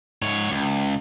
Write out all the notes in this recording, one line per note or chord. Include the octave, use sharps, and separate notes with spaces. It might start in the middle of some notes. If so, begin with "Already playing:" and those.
G#2 C#5
C#2